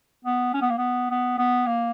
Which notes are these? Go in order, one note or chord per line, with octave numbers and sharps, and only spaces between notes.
B3
C#4
B3
A#3
B3
B3
B3
A#3